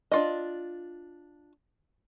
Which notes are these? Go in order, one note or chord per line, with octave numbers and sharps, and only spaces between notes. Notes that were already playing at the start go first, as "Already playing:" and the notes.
D4 F4 D#5